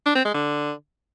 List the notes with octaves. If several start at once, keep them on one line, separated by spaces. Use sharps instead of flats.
D4
C4
G#3
D3